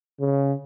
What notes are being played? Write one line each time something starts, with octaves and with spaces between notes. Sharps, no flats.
C#3